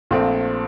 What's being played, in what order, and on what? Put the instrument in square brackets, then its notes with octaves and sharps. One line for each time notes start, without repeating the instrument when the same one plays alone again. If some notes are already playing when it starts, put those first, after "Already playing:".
[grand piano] A#1 A#2 A3 C4